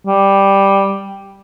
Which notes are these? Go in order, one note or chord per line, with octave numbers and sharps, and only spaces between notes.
G3